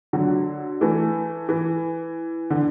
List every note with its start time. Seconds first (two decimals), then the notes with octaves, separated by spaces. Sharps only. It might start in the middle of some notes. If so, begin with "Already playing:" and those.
0.13 D3 F#3
0.81 E3 A3
1.49 E3
2.50 D3